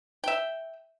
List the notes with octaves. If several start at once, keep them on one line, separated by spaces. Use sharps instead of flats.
E5 G5